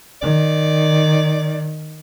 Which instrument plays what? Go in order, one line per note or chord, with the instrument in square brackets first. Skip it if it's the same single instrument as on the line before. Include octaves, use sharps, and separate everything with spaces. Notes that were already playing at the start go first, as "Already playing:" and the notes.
[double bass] D#3 [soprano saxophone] D5